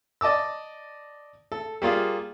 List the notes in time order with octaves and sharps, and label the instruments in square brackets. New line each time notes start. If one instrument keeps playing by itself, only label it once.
[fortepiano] D5 D#5 A5 D6 E6
A4
G3 A#3 F4 G#4